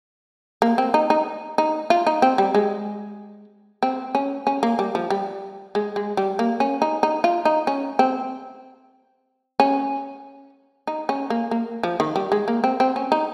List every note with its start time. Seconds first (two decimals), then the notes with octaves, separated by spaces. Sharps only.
0.62 A#3
0.78 C4
0.94 D#4
1.10 D#4
1.58 D#4
1.90 F4
2.07 D#4
2.22 C4
2.38 G3
2.55 G#3
3.83 C4
4.15 C#4
4.47 C#4
4.63 A#3
4.79 G3
4.95 F3
5.10 G3
5.75 G#3
5.96 G#3
6.17 G3
6.39 A#3
6.60 C#4
6.82 D#4
7.03 D#4
7.24 F4
7.45 D#4
7.67 C#4
7.99 C4
9.60 C#4
10.87 D#4
11.09 C#4
11.30 A#3
11.51 A#3
11.83 F3
12.00 D#3
12.16 G3
12.32 G#3
12.48 A#3
12.64 C4
12.80 C4
12.96 C#4
13.12 D#4